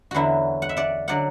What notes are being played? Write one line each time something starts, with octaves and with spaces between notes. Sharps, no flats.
E2 D3 F#3 E4 F#4
F#5
E5
D5 F#5
D3 F#3 D5 F#5